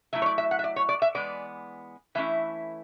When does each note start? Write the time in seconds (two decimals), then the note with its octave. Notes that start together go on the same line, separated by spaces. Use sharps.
0.13 F#3 A3 E4 E5
0.22 C#5
0.26 D5
0.38 E5
0.51 F#5
0.59 E5
0.64 D5
0.76 C#5
0.89 D5
1.02 E5
1.15 E3 G#3 B3 D5
2.15 E3 A3 C#4 E4 E5